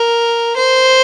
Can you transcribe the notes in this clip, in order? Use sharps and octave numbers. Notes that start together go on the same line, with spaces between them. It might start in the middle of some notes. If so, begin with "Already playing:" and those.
Already playing: A#4
C5